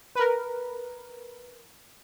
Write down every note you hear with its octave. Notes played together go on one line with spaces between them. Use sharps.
A#4 B4